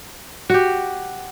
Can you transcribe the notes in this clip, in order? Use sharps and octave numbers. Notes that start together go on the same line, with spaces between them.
F#4 G4